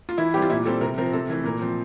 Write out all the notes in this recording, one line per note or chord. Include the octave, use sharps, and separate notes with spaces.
F4
E3 E4
G3 C4 G4
F4
A#2 E4
G3 C4 A4
C3 A#4
F3 C4 A#4
C3 A4
E3 A3
A#2 A#4
F3 C4